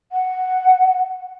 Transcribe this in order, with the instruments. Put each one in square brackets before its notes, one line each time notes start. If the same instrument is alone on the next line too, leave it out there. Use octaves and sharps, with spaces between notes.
[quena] F#5